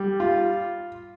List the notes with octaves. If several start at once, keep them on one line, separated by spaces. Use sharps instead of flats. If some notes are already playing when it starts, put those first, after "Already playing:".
Already playing: G3
F4